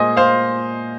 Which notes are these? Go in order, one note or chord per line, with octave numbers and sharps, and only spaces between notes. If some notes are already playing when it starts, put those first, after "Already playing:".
Already playing: A#2 G#3 C5 D#5 G#5
C5 F5